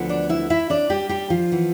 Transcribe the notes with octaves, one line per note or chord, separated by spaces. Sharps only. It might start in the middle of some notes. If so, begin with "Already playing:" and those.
Already playing: D2 D3 F3 B3
D4 D5
E4 E5
E4 E5
D4 D5
G3 G4
G3 G4
F3 F4
E3 B3